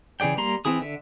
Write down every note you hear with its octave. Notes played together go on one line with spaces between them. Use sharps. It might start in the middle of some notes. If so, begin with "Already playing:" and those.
C#3 E3 G#4 D5 G5
G3 A#3 A#5 C6
E3 C4 E4 G#4 D#6
D3 E5